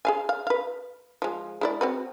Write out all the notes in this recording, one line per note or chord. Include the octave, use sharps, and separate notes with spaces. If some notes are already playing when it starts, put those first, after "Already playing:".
G#4 F5 G#5
F5
B4 F5
F3 G#3
G#3 E4 D5
C4 F#4 B4